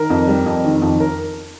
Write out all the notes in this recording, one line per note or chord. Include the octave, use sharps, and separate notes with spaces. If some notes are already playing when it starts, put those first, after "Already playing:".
Already playing: D#3 A#4
F2
G3
F2
D#3
F2
A#4